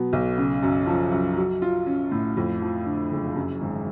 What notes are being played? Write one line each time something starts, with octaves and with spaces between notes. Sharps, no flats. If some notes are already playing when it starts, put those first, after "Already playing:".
Already playing: B2 F#3 B3
B1
C#3
F#2
F3
F#2
F#3
F4
C#4
A2
F2
F3
D3
F#1
F#2
G#1